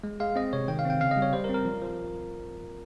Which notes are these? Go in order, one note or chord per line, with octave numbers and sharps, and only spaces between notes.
G#3
G#3 F5
C4 D#5
C3 C#5
D#3 G5
F5
C4 G5
C#3 F5
D#5
G3
C#5
G3 C5
A#4
C4
A#4
F3
F3